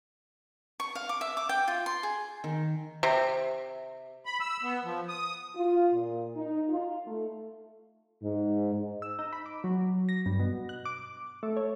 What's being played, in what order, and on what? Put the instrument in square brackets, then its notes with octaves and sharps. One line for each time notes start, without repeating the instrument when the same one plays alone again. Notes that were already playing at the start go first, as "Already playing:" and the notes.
[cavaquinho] C#6
F5
D6
E5
D6
G5
F4
C6
G#4
[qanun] D#3
[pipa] C3
[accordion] B5
E6
B3
F3
D#6
[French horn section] F4
A#2
D#4
F4
A3
G#2
[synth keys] E6
D#4
B5
D6
F#3
A#6
G2
B2
F#6
D6
A3
C#5